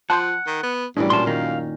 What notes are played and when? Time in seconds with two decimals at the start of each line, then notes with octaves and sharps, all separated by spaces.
0.10 F3 F#5 A5 C6 G6
0.47 D#3
0.63 B3
0.97 F#2 A2 E3 G3 D4
1.10 A#2 C#4 A5 C6
1.27 D#3 F5